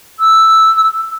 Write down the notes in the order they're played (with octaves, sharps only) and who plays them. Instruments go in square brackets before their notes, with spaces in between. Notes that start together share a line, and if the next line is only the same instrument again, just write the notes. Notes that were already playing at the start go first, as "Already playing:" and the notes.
[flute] E6